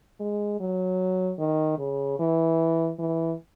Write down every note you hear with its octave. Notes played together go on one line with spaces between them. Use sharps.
G#3
F#3
D#3
C#3
E3
E3